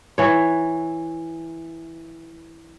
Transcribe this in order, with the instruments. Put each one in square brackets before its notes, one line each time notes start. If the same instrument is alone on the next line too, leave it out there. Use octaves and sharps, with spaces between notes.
[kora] E3 C#5